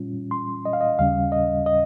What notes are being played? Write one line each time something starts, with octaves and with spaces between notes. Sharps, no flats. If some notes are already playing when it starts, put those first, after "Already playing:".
Already playing: A#2 G3 C#4 F4
C6
D#5
F5
D#5
D#2 C#3 G3 C#4 F5
D#5
D#5